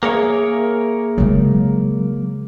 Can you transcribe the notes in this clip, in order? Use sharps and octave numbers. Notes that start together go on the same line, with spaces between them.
A#3 G#4 A#4 C#5 E5
C#3 F#3 G#3